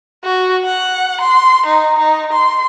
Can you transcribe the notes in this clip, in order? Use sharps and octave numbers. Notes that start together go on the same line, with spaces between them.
F#4
F#5
C6
D#4
D#4
C6